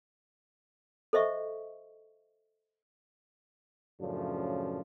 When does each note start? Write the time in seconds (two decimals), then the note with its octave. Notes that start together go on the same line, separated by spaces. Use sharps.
1.13 A4 C5 D#5 E5 C#6
4.01 F#2 A2 C#3 F3 D4